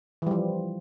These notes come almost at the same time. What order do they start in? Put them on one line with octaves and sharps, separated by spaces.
E3 G3 F3